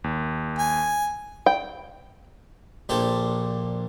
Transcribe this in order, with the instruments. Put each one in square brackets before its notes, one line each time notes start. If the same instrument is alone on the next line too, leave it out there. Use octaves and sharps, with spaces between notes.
[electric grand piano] D#2
[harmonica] G#5
[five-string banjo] G5
[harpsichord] A#1 A#3 D4 G4 A4 C5